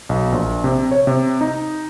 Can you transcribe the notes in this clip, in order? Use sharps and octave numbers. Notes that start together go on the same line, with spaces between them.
B1
A#1
C3
C#5
C3
D#4